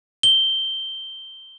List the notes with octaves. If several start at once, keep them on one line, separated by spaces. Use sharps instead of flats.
G7